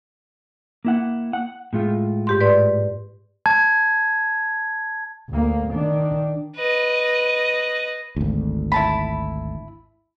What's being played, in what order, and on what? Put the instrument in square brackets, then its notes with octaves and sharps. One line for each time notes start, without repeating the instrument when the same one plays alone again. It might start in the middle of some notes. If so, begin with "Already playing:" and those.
[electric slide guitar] A#3 E4 F#5
F#5
A2 G#3 F4
[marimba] G#2 G4 C6
B4 D5 C6
[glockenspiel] A5 G#6
[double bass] D2 A#3
D#3 D4
[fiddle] B4 D#5
[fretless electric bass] G#1 D2
[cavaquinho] E4 A5 B5